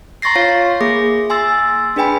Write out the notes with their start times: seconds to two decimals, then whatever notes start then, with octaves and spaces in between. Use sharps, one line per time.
0.22 A#5 C6 C#6 A6 A#6 C7
0.36 F4 C#5 F5 C7
0.81 A#3 G#4 D6 A#6
1.30 G#5 C6 E6 A6
1.96 D4 G#4 B4 G5 G#5 B5